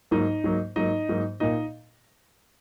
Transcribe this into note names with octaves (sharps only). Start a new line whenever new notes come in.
G#2 F#3 A#3 D#4 D#5
G#2 F#3 A#3
G#2 F#3 A#3 D#4 D#5
G#2 F#3 A#3
A#2 A#3 D#4 D#5